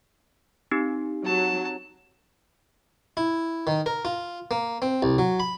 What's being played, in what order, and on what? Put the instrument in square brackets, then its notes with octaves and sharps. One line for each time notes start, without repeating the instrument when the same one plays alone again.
[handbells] C4 D#4 G4
[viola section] F#3 [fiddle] A5
[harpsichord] E4
D#3
A#4
F4
A#3
C4
C2
F#3
B5